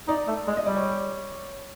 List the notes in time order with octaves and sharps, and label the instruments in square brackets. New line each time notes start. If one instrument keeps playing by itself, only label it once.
[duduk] D#4 [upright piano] D5
[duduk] A3
[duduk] G#3 [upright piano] D5
[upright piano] D#5
[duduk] G3 [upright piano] D5
[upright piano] C#5